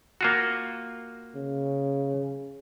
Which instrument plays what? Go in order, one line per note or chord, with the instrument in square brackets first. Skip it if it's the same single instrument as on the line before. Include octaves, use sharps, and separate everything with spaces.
[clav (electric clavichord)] A#3 F4 F#4
[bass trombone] C#3